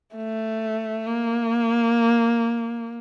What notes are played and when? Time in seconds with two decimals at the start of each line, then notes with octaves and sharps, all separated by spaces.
0.15 A3
1.07 A#3